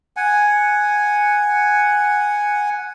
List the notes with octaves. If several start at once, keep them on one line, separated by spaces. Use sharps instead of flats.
F#5 G#5